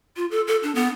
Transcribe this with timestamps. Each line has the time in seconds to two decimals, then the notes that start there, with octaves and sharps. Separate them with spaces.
0.17 F4
0.31 A4
0.47 A4
0.63 D4
0.75 B3